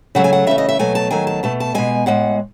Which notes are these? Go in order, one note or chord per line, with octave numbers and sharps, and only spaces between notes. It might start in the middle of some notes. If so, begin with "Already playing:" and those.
C#3 F#3 A3 F#5
G#5
F#5
C#3 E3 A3 E5
D#5
E5
B2 F#3 A3 G#5
A5
D#3 F#3 A3 G#5
A5
B2 A3 A5
A5
B2 G#3 G#5
A2 G#3 F#5